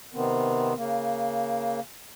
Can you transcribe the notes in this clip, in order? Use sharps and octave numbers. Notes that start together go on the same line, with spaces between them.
C3 D#3 B3 C4
C#3 A#3